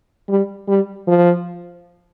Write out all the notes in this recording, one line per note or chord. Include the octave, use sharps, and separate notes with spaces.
G3
G3
F3